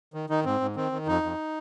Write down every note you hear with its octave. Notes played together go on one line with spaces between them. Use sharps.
D#3
D#3 D#4
G#2 C4
G#2
D#3 C4
D#3
F2 D#4
F2